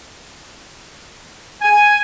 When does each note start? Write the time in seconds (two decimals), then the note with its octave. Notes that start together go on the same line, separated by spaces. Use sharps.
1.62 G#5